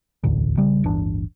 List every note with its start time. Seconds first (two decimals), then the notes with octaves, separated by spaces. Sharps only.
0.24 E1 A1 D2
0.57 A#1 C#3 G3
0.83 D1 G1 E3 D4